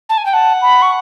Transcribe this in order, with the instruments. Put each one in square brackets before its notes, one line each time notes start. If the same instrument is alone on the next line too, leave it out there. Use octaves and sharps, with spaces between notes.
[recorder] A5
G#5
G5
[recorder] F#5 [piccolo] A5
[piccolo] B5
C#6